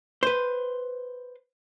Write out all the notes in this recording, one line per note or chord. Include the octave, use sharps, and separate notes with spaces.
B4 C5